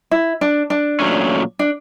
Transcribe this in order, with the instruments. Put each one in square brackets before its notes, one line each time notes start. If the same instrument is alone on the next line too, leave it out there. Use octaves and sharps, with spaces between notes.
[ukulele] E4
D4
D4
[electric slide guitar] A#2 F#3 A3 C#4
[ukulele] D4